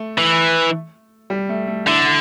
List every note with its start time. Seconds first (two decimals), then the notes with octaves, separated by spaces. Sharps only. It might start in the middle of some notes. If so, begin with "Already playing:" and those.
Already playing: A3
0.18 E3
1.30 G3
1.49 A3
1.68 A3
1.86 D3 E4